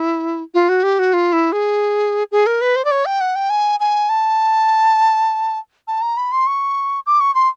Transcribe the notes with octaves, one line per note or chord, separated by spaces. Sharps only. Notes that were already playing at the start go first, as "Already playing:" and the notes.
Already playing: E4
F4
F#4
G4
F#4
F4
E4
G#4
G#4
A#4
B4
C5
D5
C#5
G5
F#5
G5
G#5
G#5
A5
A5
A#5
B5
C6
C#6
D6
C#6
C6